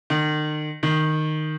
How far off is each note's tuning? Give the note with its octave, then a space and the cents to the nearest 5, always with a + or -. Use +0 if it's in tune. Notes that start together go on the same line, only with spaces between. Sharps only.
D#3 -40
D#3 -10